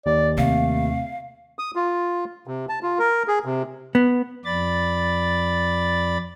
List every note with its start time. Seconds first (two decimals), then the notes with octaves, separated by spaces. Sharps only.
0.06 D#2 D5
0.38 C3 A3 F5
1.59 D#6
1.76 F4
2.47 C3
2.69 A5
2.83 F4
2.99 A#4
3.28 G#4
3.45 C3
3.95 B3
4.45 F2 D5 B5 A6